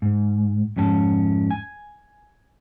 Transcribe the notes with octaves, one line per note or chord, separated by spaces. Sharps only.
G#2
F2 G#2 C#4 G#5 A5
G#5